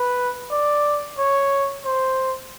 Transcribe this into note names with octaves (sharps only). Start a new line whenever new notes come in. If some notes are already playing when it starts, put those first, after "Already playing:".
Already playing: B4
D5
C#5
C5